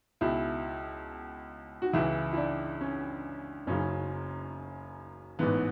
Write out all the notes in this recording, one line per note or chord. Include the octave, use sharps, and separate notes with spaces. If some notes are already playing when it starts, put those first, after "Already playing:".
C#2 B2 E4
F#4
C#2 C#3 E3 E4
E4
D4
C#4
F#1 F#2 C#3 C#4
A1 G#2 E3 B3